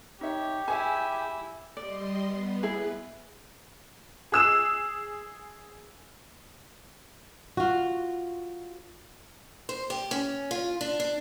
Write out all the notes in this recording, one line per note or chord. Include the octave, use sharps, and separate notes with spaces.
D#4 G4 C#5 E5
E4 G#4 C#5 E5 G#5
G3 D5 D#5 C6
B3
E4 G#4 B4
G#4 E6 E7
F4 F#4
C5
G4
C#4
F4
D4
D4